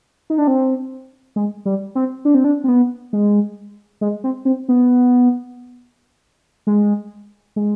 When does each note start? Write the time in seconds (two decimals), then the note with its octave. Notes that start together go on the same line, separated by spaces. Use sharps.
0.30 D#4
0.38 D4
0.47 C4
1.36 G#3
1.66 G3
1.95 C4
2.25 D4
2.35 C4
2.44 D4
2.64 C4
2.68 B3
3.13 G#3
4.01 G#3
4.24 C4
4.45 C4
4.69 B3
6.67 G#3
7.56 G#3